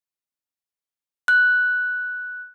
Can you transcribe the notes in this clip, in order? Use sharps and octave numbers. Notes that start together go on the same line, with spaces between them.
F#6